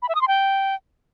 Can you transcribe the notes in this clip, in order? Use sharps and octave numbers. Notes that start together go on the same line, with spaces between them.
B5
E5
D#6
C6
G5